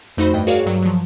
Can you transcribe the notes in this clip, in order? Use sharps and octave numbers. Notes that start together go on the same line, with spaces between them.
F2 A3 D#4 F#4 C5 B5
G2 D#5 G5
F#4 G#4 A#4 C#5 D5 F5
G2 F#3
F3 F#3